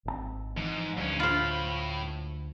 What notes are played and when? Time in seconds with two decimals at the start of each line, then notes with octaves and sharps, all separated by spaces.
0.05 G#1 C#3 C4
0.57 G#2 E3 F3 G#3
0.97 D2 G2 F#3 C#4
1.20 A2 F4 C5 B5